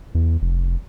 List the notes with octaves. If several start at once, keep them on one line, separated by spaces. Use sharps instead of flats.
E2
F1